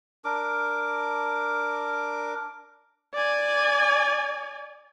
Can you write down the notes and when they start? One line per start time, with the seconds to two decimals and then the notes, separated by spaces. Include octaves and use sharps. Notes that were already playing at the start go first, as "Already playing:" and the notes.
0.25 D4 A#4 D6
3.14 D5 G#5